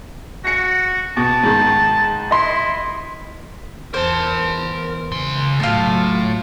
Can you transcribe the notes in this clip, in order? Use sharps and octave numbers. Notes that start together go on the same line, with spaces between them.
F#4 A#6 C#7
B2 A5
G#2 D#3
E4 D#5 C6
E2 A#4 C5 A5
C#3 C6
B1 A2 F#3 F4 A5